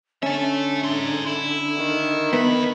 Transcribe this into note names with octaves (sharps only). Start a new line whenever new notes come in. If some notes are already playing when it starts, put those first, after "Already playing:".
D3 C#4 E5 A5
D#4 C6
E4
D#3
E2 B3 B5